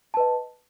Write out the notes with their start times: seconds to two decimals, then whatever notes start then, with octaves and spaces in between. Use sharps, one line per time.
0.14 A5
0.17 B4
0.20 D#5